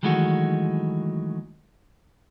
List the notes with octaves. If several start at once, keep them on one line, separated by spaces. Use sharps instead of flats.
D#3 E3 F#3 G#3 A3 F#4